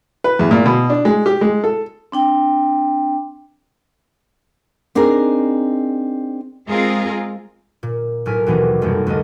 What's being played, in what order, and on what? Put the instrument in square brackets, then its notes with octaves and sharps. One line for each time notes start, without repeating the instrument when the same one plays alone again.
[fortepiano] B4
E2
A#2
B2
D4
G#3
G4
G#3
A4
[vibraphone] C4 D4 G5
[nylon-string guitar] C4 D4 D#4 G#4 A#4
[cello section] G#3 C4 F4 G#4 A#4
[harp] A#2
B1 A2 A#4 G#5 B6
D#2 B2 E3 B3 F#4 G4
F1 F#2 G3 A3
D2 A#3 D4 A4 D#5